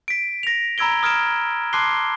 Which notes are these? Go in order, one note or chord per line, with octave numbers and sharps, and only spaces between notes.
B6 D7
A#6 F7
A#5 B5 E6 G#6 D7 G7
D#6 F6 G#6 D7 E7
A5 C6 D6 F#6 C7 G7